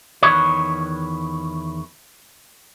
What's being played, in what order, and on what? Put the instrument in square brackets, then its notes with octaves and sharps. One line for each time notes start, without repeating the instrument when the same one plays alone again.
[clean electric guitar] E2 D#3 B4 C#5